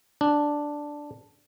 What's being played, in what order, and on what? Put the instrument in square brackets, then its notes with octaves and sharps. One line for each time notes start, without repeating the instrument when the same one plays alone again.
[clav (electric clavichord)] D4